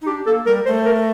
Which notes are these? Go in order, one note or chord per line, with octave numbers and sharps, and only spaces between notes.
D#4
D4 G4
A#3 A4
G3 A#4
A3 C5
A#4